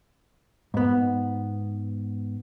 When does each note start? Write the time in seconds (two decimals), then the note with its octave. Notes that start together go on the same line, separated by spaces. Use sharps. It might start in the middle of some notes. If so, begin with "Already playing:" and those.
0.74 G#2 B3